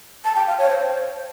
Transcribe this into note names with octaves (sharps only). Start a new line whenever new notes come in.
A5
G5
F5
C#5
C5